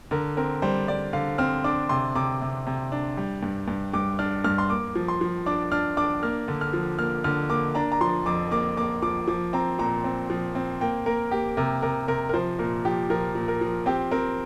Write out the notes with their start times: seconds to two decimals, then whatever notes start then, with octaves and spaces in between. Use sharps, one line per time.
0.11 D3 A#4
0.37 C4 A#4
0.62 G3 C5
0.88 G3 D5
1.13 D3 F5
1.38 C4 F6
1.64 D4 D6
1.89 C3 C6
2.15 C3 D6
2.41 C3
2.67 C3
2.92 D4
3.17 G3
3.43 G2
3.68 G2
3.94 G2 D6
4.19 D4 F6
4.44 G2 F6
4.58 C6
4.70 A#3 D6
4.95 F3
5.08 C6
5.21 F3
5.46 D4 D6
5.72 D4 F6
5.97 D4 D6
6.23 A#3 F6
6.48 D3
6.61 F6
6.73 F3
6.99 A#3 F6
7.24 D3 F6
7.49 A#3 D6
7.75 D4 A#5
7.92 A#5
8.01 F3 C6
8.26 F2 D6
8.51 A#3 D6
8.77 A#3 D6
9.02 F3 D6
9.28 F3 D6
9.53 C4 A#5
9.79 A#2 A#5
10.04 C4
10.30 F3
10.55 C4
10.81 A#3 G5
11.06 A#3 A#4
11.31 A#3 G4
11.57 C3 A#4
11.82 C3 A#4
12.08 C3 A#4
12.29 A#4
12.34 F3 C5
12.59 A#2 A#4
12.85 F3 G4
13.10 F3 A#4
13.35 A#2
13.48 A#4
13.61 F3
13.86 C4 G4
14.12 C4 A#4